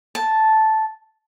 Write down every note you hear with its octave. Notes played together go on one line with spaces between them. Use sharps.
A5